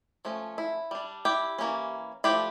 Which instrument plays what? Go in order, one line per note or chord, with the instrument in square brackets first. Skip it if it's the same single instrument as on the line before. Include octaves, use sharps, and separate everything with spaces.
[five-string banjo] F3 A3 C#4
E4
G3 D4
E4 G4
E3 A#3 C#4
F3 A3 D4 E4 G4